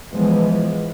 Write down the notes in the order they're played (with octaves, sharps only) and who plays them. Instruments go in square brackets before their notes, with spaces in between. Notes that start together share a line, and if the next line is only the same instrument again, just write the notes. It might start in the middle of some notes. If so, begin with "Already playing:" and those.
[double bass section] E3 F3 G#3 B3